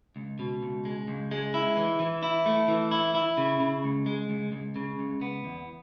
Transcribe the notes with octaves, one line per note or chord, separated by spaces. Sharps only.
C#2
B2
C#2
G#3
C#2
G#3
E4
E3
E3
E4
A3
E3
E4
E4
C#3
C#3
C#2
G#3
C#2
C#2
C#3
C#2
B3
E2